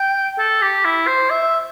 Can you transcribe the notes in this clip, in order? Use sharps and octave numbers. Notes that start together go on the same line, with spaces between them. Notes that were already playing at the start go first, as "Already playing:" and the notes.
Already playing: G5
A4
G4
E4
C5
E5